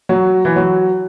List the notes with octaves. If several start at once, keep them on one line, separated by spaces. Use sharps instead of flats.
F#3
E3
F#3